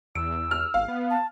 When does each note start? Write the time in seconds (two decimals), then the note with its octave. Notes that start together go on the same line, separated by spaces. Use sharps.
0.15 E2 E6 D7
0.51 F6
0.74 G#1 F5
0.88 B3
1.10 A5